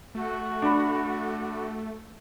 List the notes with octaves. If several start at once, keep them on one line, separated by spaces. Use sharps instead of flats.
A3 F#4
D4 B5